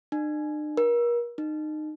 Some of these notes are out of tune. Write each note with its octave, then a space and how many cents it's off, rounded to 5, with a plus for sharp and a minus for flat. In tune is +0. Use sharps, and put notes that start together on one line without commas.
D4 +45
A#4 +35
D#4 -25